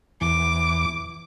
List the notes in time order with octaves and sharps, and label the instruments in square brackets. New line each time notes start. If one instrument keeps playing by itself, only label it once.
[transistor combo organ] E2 [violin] D6